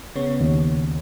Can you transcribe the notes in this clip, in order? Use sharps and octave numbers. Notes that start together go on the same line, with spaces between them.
C#3 B3 C#5
D#2